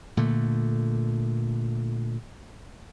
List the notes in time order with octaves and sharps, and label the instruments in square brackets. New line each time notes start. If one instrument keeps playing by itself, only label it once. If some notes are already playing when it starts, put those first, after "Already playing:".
[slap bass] A#2 D3 A3